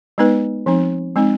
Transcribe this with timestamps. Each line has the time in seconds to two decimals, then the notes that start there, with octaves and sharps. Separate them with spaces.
0.18 G#3 B3 D#4 B4
0.66 F3 C4 D#4
1.16 G#3 C4 D#4